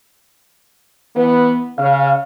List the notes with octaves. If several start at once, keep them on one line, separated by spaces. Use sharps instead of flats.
E3 B3
C#3 F5